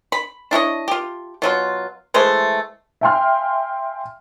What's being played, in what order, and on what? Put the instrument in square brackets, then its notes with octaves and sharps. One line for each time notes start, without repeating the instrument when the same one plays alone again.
[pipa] B5
D4 E4 C#5 D#5
F4 G4
B2 F#3 F4
E3 G#3 A3 C5
[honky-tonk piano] E5 F5 G5 G#5 C6 F6